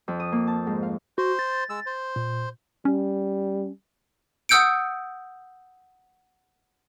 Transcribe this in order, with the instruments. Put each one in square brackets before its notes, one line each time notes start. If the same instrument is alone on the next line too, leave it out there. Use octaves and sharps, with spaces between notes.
[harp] F2
D#6
A#3
A5
G#2
F5
[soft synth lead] F#4 [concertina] C5
[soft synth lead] A6
[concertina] G#3 E6
C5
[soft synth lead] A#2
[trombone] G3 [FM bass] C#4
[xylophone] F#5 D#6 E6 G6 C#7 D7